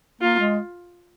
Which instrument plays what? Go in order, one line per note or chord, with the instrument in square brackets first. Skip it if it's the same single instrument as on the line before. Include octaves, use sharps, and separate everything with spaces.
[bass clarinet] A#3 [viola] F4
[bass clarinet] G#3